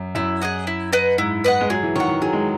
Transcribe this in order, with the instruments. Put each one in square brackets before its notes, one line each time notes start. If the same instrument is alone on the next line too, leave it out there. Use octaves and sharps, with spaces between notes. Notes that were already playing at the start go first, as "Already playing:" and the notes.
Already playing: [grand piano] F#2
[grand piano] F#2 [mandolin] E4
[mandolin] G#4 D#5 F#5
E4
B4 D#5 F#5
[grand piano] G#2 [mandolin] E4
[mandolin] B4 D#5 F#5
[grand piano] G#3
[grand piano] F#3 [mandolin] G#4
[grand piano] E3
[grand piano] D#3 [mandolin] C#5 F#5
[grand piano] E3
[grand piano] F#3 [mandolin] G#4
[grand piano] G#3